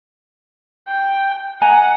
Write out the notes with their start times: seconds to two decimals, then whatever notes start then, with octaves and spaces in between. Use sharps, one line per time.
0.88 G5
1.62 D#5 F#5 G#5 A#5